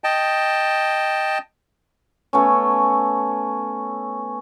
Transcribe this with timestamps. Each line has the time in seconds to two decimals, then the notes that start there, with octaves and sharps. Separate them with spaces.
0.04 D#5 G5 A5
2.33 A3 B3 C#4